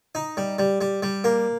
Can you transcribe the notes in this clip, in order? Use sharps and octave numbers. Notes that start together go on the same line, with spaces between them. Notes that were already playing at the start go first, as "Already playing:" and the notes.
D#4
G3
G3
G3
G3
A#3